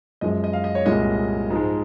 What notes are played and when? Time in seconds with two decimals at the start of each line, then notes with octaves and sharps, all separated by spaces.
0.21 F#2 F3 G#3 D#5
0.44 D#5
0.53 F5
0.64 D#5
0.75 C#5
0.85 C2 A#2 G#3 D#5
1.50 G#2 F3 G#3